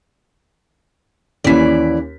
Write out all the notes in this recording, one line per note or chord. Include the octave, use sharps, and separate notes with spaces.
D#2 E3 C#4 D5 B6